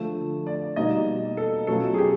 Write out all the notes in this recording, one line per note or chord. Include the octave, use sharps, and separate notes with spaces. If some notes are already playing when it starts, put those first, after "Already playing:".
Already playing: D3 F3 A3
D5
B2 G3 A#3 D#4 D#5
A4
B2 F#3 A3 C#4 F4 A4
G#4
G4